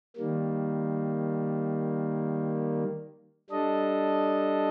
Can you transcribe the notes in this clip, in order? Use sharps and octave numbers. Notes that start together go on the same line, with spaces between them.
D#3 G3 A#3
G3 D4 A4 D#5